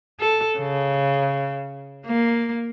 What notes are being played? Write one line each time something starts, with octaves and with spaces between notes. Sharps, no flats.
A4
C#3
A#3